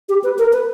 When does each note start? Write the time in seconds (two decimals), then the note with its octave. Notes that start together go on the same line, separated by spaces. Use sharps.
0.09 G4
0.24 B4
0.39 A#4
0.53 B4